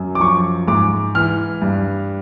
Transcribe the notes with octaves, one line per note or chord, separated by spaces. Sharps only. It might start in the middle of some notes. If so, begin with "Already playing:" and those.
Already playing: F#2
D6
F3 C#6
G#2 D6
E3 F6
G2